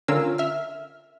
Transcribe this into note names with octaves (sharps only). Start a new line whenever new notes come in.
D3 C#4 F4 A#4 E6
E5 F6